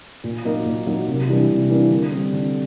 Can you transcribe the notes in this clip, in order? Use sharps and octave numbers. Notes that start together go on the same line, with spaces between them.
A#2
F#3 A#3 D#4
A#2
F#3 A#3 D#4
C3
E3 G3 A#3 D4
C3
E3 G3 A#3 D4
D3
G3 C4
D3